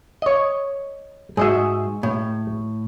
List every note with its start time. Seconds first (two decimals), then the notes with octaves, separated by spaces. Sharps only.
0.22 C#5 D#5
1.37 G#2 F#4 G#4 D#5 E5
2.03 A2